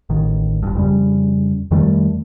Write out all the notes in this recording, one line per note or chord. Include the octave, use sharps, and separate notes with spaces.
A1 D#3
G1 G2
F2 C#3 G3
F2 D#3 G3 A3